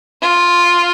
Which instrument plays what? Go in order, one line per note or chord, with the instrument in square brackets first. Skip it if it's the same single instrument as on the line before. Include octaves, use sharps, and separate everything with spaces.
[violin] F4